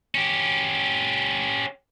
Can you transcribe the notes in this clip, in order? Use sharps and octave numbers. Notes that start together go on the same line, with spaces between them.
C#4 G4